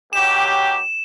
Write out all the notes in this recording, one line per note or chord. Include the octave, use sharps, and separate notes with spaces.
C#2 F#3 G4 E7